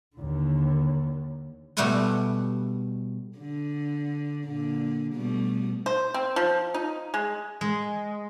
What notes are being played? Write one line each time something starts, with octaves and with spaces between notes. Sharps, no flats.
D#2 D3
B2 G3 A3 F#5 G#5 C6
D3
A#2 D3
B2 G3 A3
C5
C4
F3
D#4
G#3
G#3